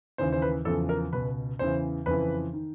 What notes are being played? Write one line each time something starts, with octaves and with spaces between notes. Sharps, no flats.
D#2 C#3 E3 C5
C5
B4
E2 C#3 F3 A4
A#4
C#2 B2 B4
E2 C#3 E3 C5
F2 C#3 E3 B4
D#3